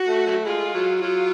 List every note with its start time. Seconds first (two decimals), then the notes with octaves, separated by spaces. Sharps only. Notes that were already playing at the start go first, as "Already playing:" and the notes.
Already playing: F#4
0.08 A3
0.27 F#3 A3
0.46 G#3 F4
0.74 F#3
1.02 F#3 F4